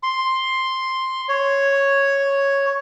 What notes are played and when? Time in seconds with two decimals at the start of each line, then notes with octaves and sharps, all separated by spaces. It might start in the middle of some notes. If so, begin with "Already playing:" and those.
0.03 C6
1.29 C#5